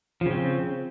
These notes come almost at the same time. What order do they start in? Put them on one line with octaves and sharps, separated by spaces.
F3 C#3 C4